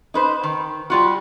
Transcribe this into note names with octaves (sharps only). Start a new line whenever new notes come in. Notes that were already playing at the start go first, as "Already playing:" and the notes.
D#4 B4 C5
D#3
G3 F4 F#4